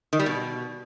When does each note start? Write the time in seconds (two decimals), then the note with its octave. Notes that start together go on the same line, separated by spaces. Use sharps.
0.13 D#3
0.19 G3
0.26 B2